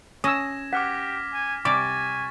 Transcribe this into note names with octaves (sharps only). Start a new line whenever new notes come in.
C#4 D#6 E6 G#6 A#6 E7
G4 F#5 D6 F6 B6
G#5
C3 G3 G#5 C#6 D6 A6 B6